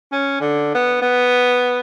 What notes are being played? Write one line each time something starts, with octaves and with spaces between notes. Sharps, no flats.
C#4
D3
B3
B3